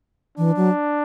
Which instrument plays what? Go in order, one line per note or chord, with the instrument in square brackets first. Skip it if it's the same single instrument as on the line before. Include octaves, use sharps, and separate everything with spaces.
[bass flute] E3 [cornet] D4
[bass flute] F#3